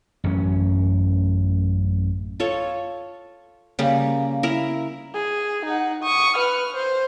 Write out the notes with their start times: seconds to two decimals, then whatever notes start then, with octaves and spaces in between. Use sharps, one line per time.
0.24 A1 F#2 B3 C#4
2.40 F4 A4 C#5
3.79 C#3 G3 A#3
4.43 E4 A#4
5.14 G#4
5.66 D#4 F#5
6.03 C#6 D#6
6.37 B4 F6
6.74 C5